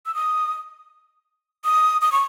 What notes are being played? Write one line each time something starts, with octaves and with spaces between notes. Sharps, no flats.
E6
D#6
D#6
D#6
C#6